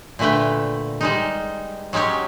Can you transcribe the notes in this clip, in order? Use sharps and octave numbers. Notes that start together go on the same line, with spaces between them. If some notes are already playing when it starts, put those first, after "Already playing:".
A#2 D3 A3 B4 G5
G3 G#3 D#4
F#3 G#3 C#4 G4 C#5